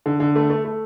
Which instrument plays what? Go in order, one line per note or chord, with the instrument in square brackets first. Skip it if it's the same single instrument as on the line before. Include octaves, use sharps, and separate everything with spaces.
[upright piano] D3
D3
A3
A3
A3